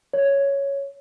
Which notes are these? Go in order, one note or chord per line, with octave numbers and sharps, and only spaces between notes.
C#5